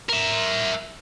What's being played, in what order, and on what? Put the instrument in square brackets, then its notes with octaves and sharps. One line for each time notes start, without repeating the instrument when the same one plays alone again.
[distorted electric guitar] A#4 E5